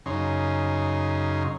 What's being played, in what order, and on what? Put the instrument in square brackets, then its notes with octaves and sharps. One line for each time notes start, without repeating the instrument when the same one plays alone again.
[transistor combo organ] F#2 C#3 D#4 C#5 C6